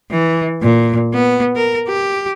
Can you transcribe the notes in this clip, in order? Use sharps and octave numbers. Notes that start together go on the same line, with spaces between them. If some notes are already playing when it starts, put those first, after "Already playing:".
E3
A#2
B3
A#4
G4